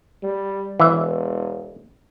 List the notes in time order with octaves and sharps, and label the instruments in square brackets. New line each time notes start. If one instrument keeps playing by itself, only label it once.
[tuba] G3
[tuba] E1 [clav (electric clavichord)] E3 E5